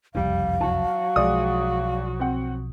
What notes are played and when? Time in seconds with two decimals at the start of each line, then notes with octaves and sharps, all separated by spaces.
0.15 F#1 C2 F2 G3 F5
0.61 F#3 F#4 A5
1.16 B1 F3 G#3 D5 D#6
2.19 C4 F#5